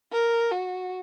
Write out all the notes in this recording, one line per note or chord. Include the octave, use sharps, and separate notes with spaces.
A#4
F#4